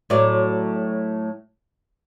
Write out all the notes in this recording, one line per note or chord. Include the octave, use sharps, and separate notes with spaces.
A2 F#3 D5